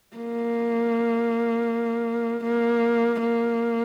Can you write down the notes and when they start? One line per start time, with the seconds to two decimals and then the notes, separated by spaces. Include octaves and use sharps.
0.16 A#3
2.44 A#3
3.20 A#3